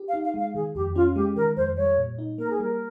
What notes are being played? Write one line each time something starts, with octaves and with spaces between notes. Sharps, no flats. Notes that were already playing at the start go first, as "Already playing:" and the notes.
Already playing: G4
F5
D#4
F5
G#3
F5
D#3 G#4
F2 G4
C#4 F4
G#3 G4
D#3 A#4
F2 C5
G3 C#5
A#2
D#4
A#3 A#4
G#4
G3 A#4